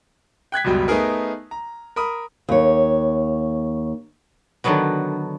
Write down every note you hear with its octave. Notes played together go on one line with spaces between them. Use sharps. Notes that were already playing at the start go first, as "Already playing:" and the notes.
G5 F#6 G#6 B6
C#2 F#2 B2 G3
A3 B3 D#4 G#4 A#4
A#5
A#4 B5 D#6
D#2 C#5
D3 D#3 F#3 B3 F#4